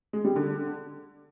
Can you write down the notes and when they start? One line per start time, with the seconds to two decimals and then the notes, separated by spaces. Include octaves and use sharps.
0.13 G#3
0.25 G3
0.36 D3